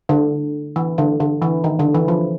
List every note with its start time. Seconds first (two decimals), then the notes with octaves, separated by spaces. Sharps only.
0.09 D3
0.76 E3
0.98 D3
1.20 D3
1.42 E3
1.64 D#3
1.80 D3
1.95 E3
2.08 F3